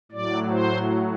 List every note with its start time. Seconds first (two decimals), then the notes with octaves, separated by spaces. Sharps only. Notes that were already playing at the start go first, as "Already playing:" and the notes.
0.12 A2 F#3 D5
0.51 C5